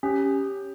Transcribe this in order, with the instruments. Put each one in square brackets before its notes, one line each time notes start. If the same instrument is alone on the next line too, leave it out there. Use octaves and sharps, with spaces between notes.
[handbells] C#4 [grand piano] G4